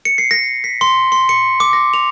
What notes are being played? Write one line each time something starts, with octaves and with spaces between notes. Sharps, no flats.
C#7
C7
A#6
B6
C6
C6
C#7
D6
A#6
F7